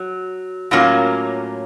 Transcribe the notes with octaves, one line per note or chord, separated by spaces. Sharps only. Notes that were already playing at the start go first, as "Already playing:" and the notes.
Already playing: F#3
A2 F#3 A#3 C#4 F4